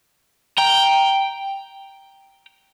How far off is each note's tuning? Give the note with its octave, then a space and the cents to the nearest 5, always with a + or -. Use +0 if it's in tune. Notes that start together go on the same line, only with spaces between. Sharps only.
G5 +0 A#5 +0